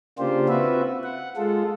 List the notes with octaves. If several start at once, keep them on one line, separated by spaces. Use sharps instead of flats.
C#3 A#3 D4 F4 G4 C5
C4 F4 F#4 B4 E5
F#5
G#3 F4 A4